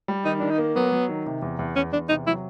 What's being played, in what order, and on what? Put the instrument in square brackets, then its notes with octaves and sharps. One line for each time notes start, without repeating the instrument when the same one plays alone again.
[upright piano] G3
[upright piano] D#3 [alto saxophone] D#4
[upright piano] D#3 [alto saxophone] D4
[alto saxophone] D#4
[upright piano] A#3
[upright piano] F#3 [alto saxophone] B3
[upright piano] F#3
D#3
C3
E2
E2
[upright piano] E2 [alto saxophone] C#4
[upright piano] E2 [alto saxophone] D4
[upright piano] C3 [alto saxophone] D#4
[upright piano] F#3 [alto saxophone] E4